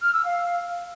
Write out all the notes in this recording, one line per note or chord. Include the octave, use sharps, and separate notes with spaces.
F6
E6
F5